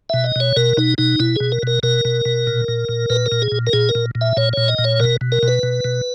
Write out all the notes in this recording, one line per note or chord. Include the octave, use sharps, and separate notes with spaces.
B2 E5
D#5
B2 C#5
B2 A#4
B2 D#4
B2 D#4
B2 E4
B2 G#4
A#4
B2 A#4
B2 A#4
B2
B2
A#2
A#2
A#2
A#2 B4
A#4
A#2
G#4
A#2
A#4
A#2 G#4
A#4
A#2
A#2
E5
A#2 C#5
A#2 C#5
D#5
A#2
C#5
B2 A#4
B2
A#4
B2
B4
B2
B2